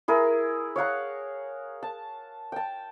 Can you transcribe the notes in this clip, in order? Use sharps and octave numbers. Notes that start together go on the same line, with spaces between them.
E4 G#4 A#4
C#5 F5 F#5 A#5
A5
G5 A5